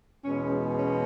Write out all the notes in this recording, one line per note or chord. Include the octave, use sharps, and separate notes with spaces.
E2 B2 G#3 C#4
C#4